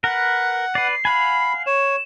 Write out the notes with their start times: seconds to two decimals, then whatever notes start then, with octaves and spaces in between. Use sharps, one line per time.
0.04 A#4 B4 F#5 F#6
0.75 B4 D5 C7
1.05 F5 F#5 G#5 B5
1.66 C#5 E7